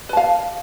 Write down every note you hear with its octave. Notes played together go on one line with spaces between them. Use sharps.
B4 F5 A5